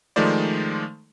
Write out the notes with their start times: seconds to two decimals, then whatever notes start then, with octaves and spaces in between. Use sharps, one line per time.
0.16 D#3 F3 G#3 A3 C5 D5